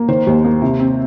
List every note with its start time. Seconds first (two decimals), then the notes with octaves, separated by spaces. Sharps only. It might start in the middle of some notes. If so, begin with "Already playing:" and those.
Already playing: A#3
0.08 D#3 C5
0.27 D#2
0.45 A#3
0.62 C3
0.80 C4